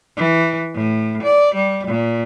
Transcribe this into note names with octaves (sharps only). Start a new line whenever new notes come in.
E3
A2
D5
G3
A#2